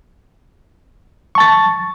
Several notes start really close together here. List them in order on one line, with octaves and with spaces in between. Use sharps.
C#6 A5 A6